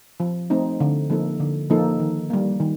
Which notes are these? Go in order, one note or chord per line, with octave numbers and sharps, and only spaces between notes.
F3
A3 C4 D#4
D3
F3 A#3 D#4 A4
D3
F3 A#3 D#4 A4
D#3
G3 A#3
D#3